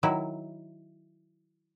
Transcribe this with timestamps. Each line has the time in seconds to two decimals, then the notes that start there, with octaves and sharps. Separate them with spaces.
0.03 D#3 F#3 E4